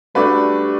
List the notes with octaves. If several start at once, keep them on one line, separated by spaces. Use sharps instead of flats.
G3 A3 D4 F#4 B4